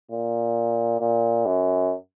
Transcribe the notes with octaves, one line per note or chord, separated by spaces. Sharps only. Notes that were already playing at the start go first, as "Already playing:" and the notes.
A#2
A#2
F#2